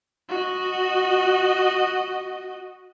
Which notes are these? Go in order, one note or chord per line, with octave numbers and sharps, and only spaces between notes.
F#4 D#5